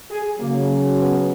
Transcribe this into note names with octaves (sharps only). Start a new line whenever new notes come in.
G#4
C#3 F#3 A#3
B3